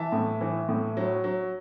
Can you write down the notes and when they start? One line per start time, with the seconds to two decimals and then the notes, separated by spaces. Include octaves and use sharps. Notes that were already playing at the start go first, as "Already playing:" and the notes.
Already playing: E3 E5 A5
0.12 A2
0.41 E3
0.69 A2
0.97 F#3
1.24 F#3